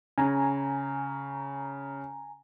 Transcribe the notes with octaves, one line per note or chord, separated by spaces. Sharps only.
C#3 G#5 A#5